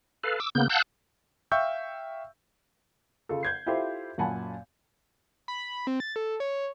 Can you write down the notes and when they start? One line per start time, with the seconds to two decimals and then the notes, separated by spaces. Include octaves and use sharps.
0.24 A4 B4 F5
0.40 D6 E6
0.55 C#3 A#3 B3 G6
0.69 F5 F#5 A5 E6 F#6 G6
1.52 E5 F5 G5 C#6 E6 G6
3.29 C#3 F4 A4
3.43 G6 G#6 C7
3.66 E4 F4 G4 A4 C5 E5
4.18 F#2 A#2 F#5 G#5 A5 B5
5.48 B5
5.87 C4
6.00 A6
6.16 A4
6.40 C#5